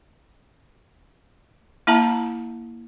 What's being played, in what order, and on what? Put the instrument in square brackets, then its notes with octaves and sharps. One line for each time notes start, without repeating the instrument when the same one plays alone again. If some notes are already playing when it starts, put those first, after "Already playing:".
[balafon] A#3 E4 E5 A5 A#5